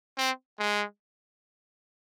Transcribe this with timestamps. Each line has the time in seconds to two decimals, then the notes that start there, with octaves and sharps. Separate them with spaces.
0.18 C4
0.59 G#3